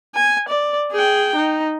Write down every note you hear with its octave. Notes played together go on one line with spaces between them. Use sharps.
G#5
D5
G#4 G5
D#4